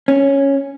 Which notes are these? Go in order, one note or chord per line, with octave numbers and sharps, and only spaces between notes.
C#4